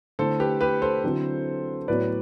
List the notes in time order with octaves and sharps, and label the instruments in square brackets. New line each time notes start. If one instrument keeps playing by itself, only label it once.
[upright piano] D3 A3 E4 [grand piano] A4 C5
[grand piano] G4 B4
G4 B4
A4 C5
[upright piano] D3 F#3 C4 E4
[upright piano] A2 F#3 B3 E4 [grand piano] B4 D5